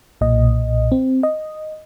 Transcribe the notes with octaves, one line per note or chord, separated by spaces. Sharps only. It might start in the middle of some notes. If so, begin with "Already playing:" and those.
B1 A#2 D#5
C4
D#5